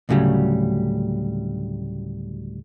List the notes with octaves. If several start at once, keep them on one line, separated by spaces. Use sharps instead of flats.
D2 A2 C#3 F#3 G3